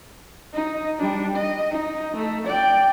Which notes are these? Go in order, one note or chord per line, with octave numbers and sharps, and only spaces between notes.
D#4
G3 D4
D#5
D#4
A3
D5 G5